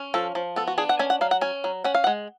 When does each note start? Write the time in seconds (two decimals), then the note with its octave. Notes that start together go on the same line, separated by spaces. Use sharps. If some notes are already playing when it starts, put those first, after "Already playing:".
Already playing: C#4
0.14 F3 A4
0.35 F3
0.56 B3 A4
0.67 F#4
0.78 D4 G#4
0.89 F#5
0.99 C#4 G#5
1.10 F#5
1.21 F#3 F5
1.31 F#5
1.41 C#4 G#5
1.64 F#3
1.84 C#4 F#5
1.95 F5
2.04 F#5
2.07 G#3